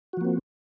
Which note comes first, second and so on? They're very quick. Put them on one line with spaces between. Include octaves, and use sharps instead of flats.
F#4 F3 A#3 C4